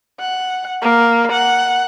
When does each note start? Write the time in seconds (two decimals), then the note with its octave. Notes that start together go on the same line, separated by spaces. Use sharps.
0.20 F#5
0.82 A#3
1.32 F#5